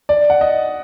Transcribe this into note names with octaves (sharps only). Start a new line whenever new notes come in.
D5
F#5
D#5